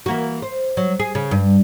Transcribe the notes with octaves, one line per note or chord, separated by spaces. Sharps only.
E3 A#3 F#4
C5
F#3
G#4
C#3
G2